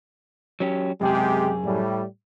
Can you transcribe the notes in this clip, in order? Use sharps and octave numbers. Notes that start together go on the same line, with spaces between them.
F#3 C#4 G4
F#2 C3 G#3 G4 G#4
A2 G3